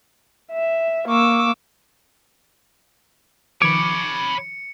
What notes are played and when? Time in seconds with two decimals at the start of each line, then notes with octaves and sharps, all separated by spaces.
0.52 E5
1.08 A#3 C#6 D6 E6
3.62 D#3 F3 B4 C#5 B5 D6 C#7